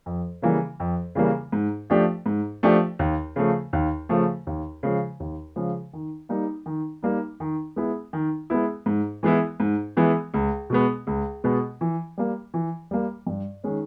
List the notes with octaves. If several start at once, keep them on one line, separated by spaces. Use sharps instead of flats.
F2
C#3 E3 G3 A#3
F2
C#3 E3 G3 A#3
G#2
F3 A3 D4 G4
G#2
F3 A3 D4 G4
D#2
C#3 F3 A3
D#2
C#3 F3 A3
D#2
C#3 F3 G#3
D#2
C#3 F3 G#3
D#3
G3 A#3 D#4
D#3
G3 A#3 D#4
D#3
G#3 B3 E4
D#3
G#3 B3 E4
G#2
E3 G#3 B3 E4
G#2
E3 G#3 B3 E4
C#2
B2 G#3 B3
C#2
B2 G#3 B3
E3
G3 A#3
E3
G3 A#3
G2
D#3 G#3 C#4